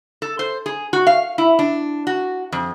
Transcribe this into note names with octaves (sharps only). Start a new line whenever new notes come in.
A4
C5
G#4
F#4
F5
E4
D4
F#4
F2